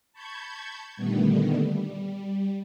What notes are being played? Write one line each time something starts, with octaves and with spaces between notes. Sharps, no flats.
A5 B5 C#6 G6 G#6
A#2 D3 D#3 G3 A3 B3
G3